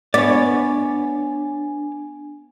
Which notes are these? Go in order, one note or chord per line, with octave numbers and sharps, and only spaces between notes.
B3 D4 C#5 D5 G#5